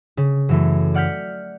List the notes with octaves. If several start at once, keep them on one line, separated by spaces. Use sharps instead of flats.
C#3
F#2 E3 A3
D5 F#5 F6 G6 B6